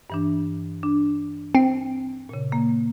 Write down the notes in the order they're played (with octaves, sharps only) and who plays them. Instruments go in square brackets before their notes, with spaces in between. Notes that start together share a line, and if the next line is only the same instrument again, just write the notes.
[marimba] G2 E3 D4
D4
[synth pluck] C4
[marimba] A#2 C#3
A#3